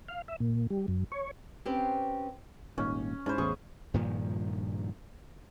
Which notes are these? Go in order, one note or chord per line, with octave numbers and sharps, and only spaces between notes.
F5
E5
A#2
G3
F#2
C#5
C4 C#4 G4 B4 C5
D#1 G#1 D#2 C#4
G#2 C#4 E4 C5
A1 E2 G#4 C#6
G2 A#2 D#3 F3